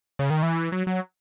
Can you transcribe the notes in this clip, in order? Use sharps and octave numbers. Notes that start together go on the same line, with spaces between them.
C#3
D#3
E3
F#3
F#3